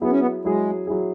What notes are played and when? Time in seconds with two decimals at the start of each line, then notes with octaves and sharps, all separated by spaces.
0.01 F#3 B3 E4 G#4
0.10 C#4
0.20 B3
0.45 F#3 G#3 E4 G#4
0.87 F#3 E4 G#4